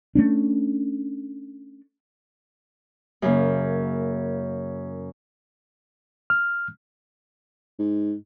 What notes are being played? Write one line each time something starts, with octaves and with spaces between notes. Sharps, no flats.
A3 C#4 D4
F#2 C#3 A#3
F6
G#2